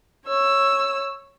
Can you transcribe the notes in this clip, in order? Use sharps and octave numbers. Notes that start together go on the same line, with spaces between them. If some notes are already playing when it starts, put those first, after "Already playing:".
C#5 E6